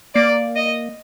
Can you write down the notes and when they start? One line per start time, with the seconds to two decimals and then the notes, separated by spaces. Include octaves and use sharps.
0.15 A#3 D5
0.56 D#5